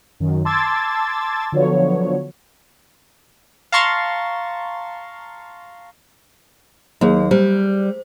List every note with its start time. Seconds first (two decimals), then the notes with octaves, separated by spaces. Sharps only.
0.20 F#2 D#3
0.45 A5 C6 D6 E6 G#6 A6
1.52 D3 F3 F#3 B3 C#5
3.72 F5 A5 A#5 C6 C#6 A6
7.01 D#2 F#3 A#3 G#4
7.31 G3 C5